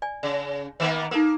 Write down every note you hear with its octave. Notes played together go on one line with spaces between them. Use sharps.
D5 G#5
C#3
D#3 A#3 B3
A#3 D#4 A4 A#4